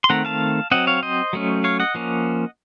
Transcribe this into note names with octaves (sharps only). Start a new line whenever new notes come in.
C6
D#3 A3 C4 F#5 A#5
F5 A5
F#3 C4 D#5 F#5
C#5 F5
C5 D#5
F#3 A3 C#4
C#5 F5
D#5 F#5
F3 A#3 C#4